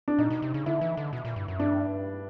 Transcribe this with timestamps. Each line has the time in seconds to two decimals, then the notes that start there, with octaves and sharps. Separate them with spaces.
0.08 D4
0.18 A#2 D#4
0.30 B2
0.42 C3
0.54 C#3
0.66 D3 E4
0.81 E3
0.97 D3
1.13 B2
1.25 A#2
1.36 G2
1.48 F#2
1.59 G2 D4